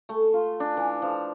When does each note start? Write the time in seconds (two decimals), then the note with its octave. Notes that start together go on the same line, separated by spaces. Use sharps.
0.09 A3
0.34 F4
0.60 D4
0.77 E3
1.02 F3